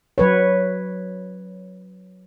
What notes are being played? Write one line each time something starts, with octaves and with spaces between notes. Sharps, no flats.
F#3 B4 C#5